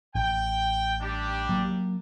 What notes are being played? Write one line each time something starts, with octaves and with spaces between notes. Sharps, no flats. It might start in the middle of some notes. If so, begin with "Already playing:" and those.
A1 G5
G3 D4 G4
F#3 A#3